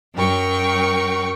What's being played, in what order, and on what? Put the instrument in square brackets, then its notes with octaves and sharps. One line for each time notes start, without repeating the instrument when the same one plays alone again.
[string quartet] F#2 F#3 A#4 G5 C#6